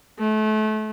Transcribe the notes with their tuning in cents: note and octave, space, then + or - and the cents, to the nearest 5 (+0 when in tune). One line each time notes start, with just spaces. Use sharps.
A3 -30